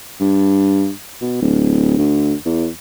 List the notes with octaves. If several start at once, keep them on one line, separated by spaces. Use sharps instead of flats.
G2
B2
D1
D2
E2